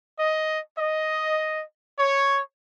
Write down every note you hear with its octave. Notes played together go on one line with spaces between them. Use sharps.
D#5
D#5
C#5